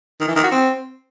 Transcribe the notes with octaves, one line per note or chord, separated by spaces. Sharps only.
D#3
E3
D#3
F#4
C4